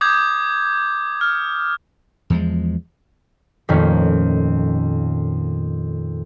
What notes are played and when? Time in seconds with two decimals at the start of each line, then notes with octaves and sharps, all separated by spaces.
0.01 D6 D#6 G6 G#6
1.21 F6
2.30 E2 F3 G#3
3.69 F2 A#2 D#3 A3 A#3 C#4